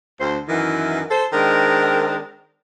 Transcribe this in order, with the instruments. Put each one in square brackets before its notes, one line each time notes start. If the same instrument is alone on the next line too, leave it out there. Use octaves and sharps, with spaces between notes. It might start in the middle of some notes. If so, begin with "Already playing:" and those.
[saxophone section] D2 C5
F#2 D#3 E3
A4 C5
D#3 G#3 C4 D4 A#4